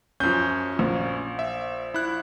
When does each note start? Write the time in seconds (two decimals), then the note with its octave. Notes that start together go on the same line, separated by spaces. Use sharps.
0.20 F#2 F3 C#4 G6
0.79 A#1
1.39 E5
1.94 E4 F#6